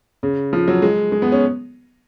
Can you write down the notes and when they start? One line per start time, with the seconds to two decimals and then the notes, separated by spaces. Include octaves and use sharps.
0.23 C#3
0.53 F3
0.68 F#3
0.82 G#3
1.12 G#3
1.22 B3
1.32 C#4